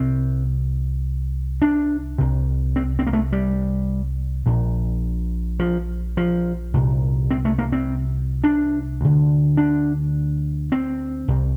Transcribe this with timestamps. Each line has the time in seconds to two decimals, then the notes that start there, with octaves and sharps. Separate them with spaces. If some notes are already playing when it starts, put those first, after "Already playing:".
Already playing: C2 C3 C4
1.62 D4
2.18 C2 C3
2.76 C4
2.99 C4
3.07 A#3
3.13 A3
3.32 G3
4.46 A#1 A#2
5.59 F3
6.17 F3
6.74 C2 A#2
7.31 C4
7.45 A3
7.59 A#3
7.72 C4
8.44 D4
9.01 D2 D3
9.57 D4
10.72 C4
11.28 C2 C3